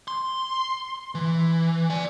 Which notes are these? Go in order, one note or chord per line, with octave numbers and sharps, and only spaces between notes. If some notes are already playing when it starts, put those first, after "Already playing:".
C6
E3
D5 G#5